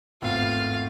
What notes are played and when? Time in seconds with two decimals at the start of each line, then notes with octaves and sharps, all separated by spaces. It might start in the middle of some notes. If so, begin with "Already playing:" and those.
0.22 G#1 E2 A2 F4 F5